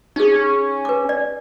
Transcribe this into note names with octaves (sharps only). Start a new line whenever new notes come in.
C#4 D#4 G#4
B4 D6
D5